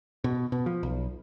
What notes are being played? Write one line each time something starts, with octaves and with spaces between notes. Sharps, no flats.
B2
B2
F3
B1